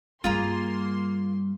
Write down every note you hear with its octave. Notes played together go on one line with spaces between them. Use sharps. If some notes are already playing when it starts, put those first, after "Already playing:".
G2 G3 A#3 F4 G#4 A#5 C6